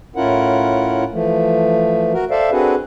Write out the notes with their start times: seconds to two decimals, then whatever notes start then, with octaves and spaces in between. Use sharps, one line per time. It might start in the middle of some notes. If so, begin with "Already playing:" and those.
0.16 A2 C#4 E4 F4 A#4 F#5
1.12 E3 F3 A3
2.13 F#4 A#4
2.31 A4 C5 D5 E5 F5
2.52 C4 D4 F#4 G#4 A4 B4